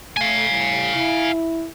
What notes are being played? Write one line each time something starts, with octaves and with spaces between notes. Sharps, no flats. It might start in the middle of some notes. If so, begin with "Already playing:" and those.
A3 F5 G#5
A2 G3
E4